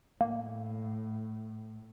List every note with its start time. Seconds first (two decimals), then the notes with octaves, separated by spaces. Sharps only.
0.21 A2 A#3